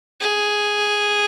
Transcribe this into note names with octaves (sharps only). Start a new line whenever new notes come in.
G#4